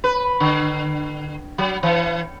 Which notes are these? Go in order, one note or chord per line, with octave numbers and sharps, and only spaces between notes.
B4
D3
F#3
E3